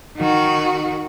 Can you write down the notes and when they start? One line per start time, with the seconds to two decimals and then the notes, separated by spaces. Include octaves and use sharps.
0.17 D#3 F#4